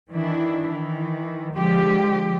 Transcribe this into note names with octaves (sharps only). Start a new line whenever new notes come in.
D#3 E3 D4 E4
D#3 E3
D3 F3 G#3 G4